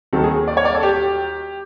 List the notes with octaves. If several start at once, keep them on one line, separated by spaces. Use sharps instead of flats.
D#2 D#3 F#3 A4
G#4
D5
C#5
D5
A4
G4